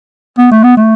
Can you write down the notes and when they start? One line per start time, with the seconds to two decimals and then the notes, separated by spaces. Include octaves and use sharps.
0.38 B3
0.51 A3
0.64 B3
0.77 A3